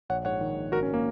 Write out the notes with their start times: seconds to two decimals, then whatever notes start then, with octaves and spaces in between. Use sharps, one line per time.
0.09 A#1 C#5 F#5
0.25 G#2 C#5 F#5
0.41 D#3
0.56 A#1
0.72 G#1 F#4 A#4
0.83 C#4
0.94 A#3